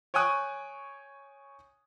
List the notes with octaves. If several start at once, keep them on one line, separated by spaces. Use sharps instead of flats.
C#5 G5 G#5 C#6 D#6 F#6